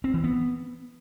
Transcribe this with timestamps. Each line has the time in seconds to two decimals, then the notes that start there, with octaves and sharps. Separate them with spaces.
0.04 C4
0.14 E3
0.24 B3